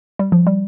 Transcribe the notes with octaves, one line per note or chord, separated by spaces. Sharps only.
G3
F3
G3